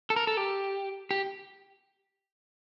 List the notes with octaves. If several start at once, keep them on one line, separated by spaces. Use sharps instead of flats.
A4
A#4
A4
G4
G4